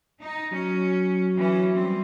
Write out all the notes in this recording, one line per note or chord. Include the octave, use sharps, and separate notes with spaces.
D#4
F#3 C#4
E3 C#4
G3 C4